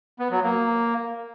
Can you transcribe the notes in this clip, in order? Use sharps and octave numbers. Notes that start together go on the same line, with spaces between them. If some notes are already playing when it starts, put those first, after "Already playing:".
B3
F#3
A#3